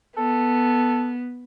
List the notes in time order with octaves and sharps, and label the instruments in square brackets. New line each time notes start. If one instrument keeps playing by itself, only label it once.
[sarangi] B3 [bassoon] A4